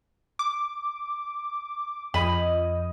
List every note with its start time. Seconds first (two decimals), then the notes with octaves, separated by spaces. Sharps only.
0.39 D6
2.14 F2 D#5 B5